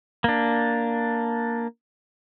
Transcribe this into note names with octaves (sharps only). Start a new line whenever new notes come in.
A#3 D4